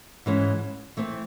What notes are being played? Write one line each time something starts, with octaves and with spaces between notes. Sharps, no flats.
G#2 E3 G#3 C#4
E3 A3 C4